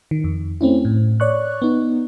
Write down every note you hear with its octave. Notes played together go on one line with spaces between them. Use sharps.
D#3
F2
A3 C4 C#4 E4
A2
C#5 D5 C#6 F#6
B3 D#4